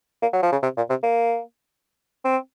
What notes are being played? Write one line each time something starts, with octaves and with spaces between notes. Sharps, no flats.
A#3
F#3
F3
C#3
C3
A#2
C3
A#3
C4